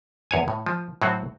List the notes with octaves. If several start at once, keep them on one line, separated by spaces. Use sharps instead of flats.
E2 C#5 G#5
A2
F3
A2 F#3 C4 F#4